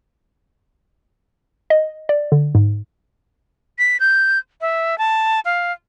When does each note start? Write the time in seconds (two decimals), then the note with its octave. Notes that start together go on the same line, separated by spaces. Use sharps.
1.70 D#5
2.09 D5
2.32 D3
2.55 G#2
3.79 B6
4.00 G6
4.61 E5
4.98 A5
5.45 F5